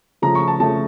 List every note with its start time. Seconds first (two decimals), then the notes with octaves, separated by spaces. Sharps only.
0.22 C#3 F3 A3 A#5
0.35 C#6
0.48 A5
0.60 C#3 F3 A3 A5